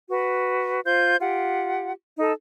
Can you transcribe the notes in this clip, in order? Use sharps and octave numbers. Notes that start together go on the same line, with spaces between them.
F#4 B4
F4 C5 G6
F4 G4 F#5
D#4 A4